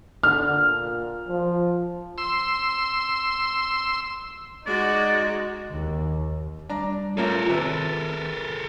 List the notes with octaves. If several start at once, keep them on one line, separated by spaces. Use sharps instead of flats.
D3 F6
A#2
F3
C6 E6
G#3 D#4 F#4 D5
D#2
G3 D4 A#5
A2 A#3 C#4 F4 A4 A#4
C3 D#3 B4 E6